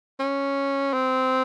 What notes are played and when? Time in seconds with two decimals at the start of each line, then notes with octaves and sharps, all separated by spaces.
0.19 C#4
0.94 C4